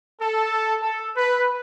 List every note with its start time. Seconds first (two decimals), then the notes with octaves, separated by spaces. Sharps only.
0.22 A4
0.83 A4
1.17 B4